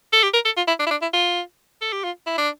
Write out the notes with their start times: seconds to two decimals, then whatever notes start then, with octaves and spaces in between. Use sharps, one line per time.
0.13 A4
0.23 G4
0.34 A#4
0.45 A4
0.57 F4
0.68 E4
0.79 D4
0.87 E4
0.91 D4
1.02 E4
1.13 F4
1.81 A4
1.93 G4
2.04 F4
2.26 E4
2.38 D4